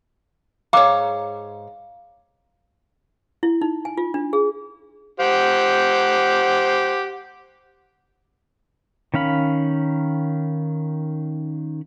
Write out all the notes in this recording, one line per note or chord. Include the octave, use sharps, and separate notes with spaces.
G#2 G#4 C#5 F5 A#5 D6
E4
D#4
G#5
F4
D4
G#4
G4 C5 F#5
D#3 C#4 F5 B5